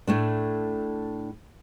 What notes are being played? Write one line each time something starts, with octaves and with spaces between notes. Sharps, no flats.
A2 A3 D4